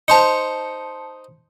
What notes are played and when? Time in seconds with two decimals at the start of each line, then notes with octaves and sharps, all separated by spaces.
0.08 D#4 C5 A5 C6 C#7